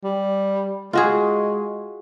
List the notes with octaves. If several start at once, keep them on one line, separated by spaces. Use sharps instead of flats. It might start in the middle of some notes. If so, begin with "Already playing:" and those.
G3
G#3 F4 F#4 G#4